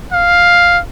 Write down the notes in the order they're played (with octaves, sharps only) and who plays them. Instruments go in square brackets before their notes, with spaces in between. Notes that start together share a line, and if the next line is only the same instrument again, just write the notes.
[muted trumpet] F5